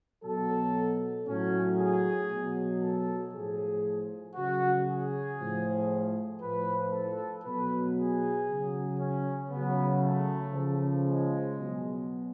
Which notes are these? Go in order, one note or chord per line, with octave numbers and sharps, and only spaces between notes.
B2 F#3 A4
A2 F#3 C#4
G#4
B2 F#3
A4
A2 F3 G#4
C#3 F#3 F#4
G#4
A2 F3
A2 F3 B4
A4
B2 F#3 B4
G#4
C#3 F#3
C#4
C#3 F#3 B3
A3
C#3 F3
G#3
B2 F#3